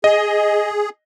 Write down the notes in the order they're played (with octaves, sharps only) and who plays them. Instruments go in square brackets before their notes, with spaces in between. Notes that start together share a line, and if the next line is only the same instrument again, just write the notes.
[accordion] G#4 [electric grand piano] D#5